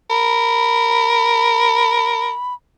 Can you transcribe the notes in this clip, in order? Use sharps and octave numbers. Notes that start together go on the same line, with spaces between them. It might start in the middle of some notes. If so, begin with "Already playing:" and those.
A#4 B5